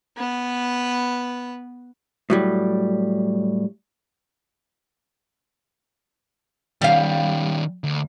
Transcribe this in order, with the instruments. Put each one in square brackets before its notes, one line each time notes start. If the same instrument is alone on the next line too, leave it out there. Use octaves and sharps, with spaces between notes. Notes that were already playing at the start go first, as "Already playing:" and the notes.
[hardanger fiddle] B3 B4
[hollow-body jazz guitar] A2 F#3 G3
[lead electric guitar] D#3 C#4 [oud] G3 F5
[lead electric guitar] D2